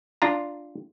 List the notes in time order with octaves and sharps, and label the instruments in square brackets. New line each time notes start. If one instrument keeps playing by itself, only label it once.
[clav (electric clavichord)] D4 F4 A#5